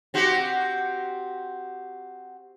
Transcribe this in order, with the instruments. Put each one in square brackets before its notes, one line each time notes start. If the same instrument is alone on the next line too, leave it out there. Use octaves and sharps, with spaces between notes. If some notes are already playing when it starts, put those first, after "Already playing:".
[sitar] C4 F#4 G4